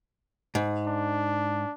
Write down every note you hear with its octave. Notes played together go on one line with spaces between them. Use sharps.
G#2
D4